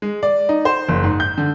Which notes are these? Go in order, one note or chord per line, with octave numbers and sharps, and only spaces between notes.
G#3
D5
D#4
C5
F#1
G#2
G6
D3